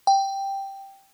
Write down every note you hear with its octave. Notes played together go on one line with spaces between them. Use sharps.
G5